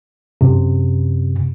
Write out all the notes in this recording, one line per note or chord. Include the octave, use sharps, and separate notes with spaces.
F#2 C3